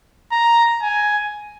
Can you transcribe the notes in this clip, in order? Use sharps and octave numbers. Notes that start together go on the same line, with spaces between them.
A#5
G#5